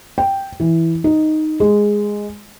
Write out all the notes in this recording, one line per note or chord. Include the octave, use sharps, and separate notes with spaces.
G5
E3
D#4
G#3